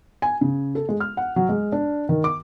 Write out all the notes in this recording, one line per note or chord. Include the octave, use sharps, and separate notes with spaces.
G#5
C#3
A4
G#3
F6
F#5
F#3
G#3
D4
D#3
D6